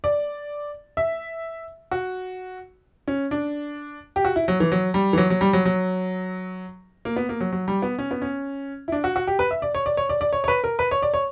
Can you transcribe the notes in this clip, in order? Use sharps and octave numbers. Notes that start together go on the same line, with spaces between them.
D5
E5
F#4
C#4
D4
G4
F#4
E4
F#3
E3
F#3
G3
E3
F#3
F#3
G3
F#3
F#3
A#3
B3
A#3
F#3
F#3
G3
B3
C#4
B3
C#4
E4
D4
F#4
F#4
G4
B4
E5
D5
C#5
D5
C#5
D5
D5
C#5
C#5
B4
A#4
B4
C#5
D5
C#5